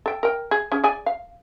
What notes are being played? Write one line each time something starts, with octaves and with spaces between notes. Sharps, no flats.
A4 G5
A#4 G5
G#4
C#4 G#4
G#4 D5 G#5
F5